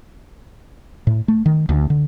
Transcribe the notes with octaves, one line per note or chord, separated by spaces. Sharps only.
A2
A3
D#3
D2
D3